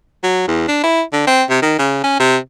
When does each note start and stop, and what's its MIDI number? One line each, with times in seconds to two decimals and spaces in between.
0.23 0.45 54
0.48 0.66 40
0.68 0.79 62
0.83 1.02 64
1.13 1.25 50
1.27 1.44 60
1.50 1.61 48
1.62 1.77 51
1.79 2.03 49
2.04 2.15 61
2.20 2.37 48